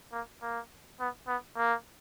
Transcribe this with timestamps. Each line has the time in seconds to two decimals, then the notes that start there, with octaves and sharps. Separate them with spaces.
0.12 A#3
0.42 A#3
1.00 B3
1.28 B3
1.57 A#3